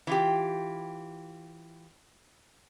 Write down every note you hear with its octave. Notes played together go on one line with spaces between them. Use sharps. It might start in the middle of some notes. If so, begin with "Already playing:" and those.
E3 F4 G4